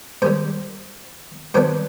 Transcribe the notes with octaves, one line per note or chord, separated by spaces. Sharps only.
G#2 D#3 G3 C5
G2 D#3 F#3 B3 D4 C5